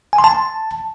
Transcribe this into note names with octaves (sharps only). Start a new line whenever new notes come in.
G#5
C6
A5